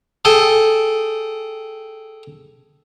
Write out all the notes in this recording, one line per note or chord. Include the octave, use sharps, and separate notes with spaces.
G#4 A4 G5